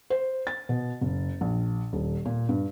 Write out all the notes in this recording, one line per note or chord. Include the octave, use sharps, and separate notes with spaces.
C5
A6
B2
F#1
A#1
D#1
A#2
G2